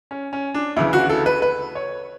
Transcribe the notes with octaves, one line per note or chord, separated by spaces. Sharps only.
C#4
C#4
D4
D2 C#3 E3 E4
F#4
A4
B4
B4
C#5